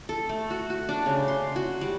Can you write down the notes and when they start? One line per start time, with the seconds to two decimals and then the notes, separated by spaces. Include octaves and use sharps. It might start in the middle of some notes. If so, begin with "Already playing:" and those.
0.09 A4
0.29 A3
0.50 F#4
0.70 F#4
0.89 D4
1.06 C#3
1.28 C6
1.56 F#4
1.81 G3